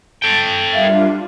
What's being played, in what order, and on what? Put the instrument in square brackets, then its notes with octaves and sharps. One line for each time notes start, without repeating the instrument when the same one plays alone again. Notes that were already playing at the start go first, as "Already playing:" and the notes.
[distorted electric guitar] A4 G5
[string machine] G3 D4 F4 [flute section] A#4 E5 F5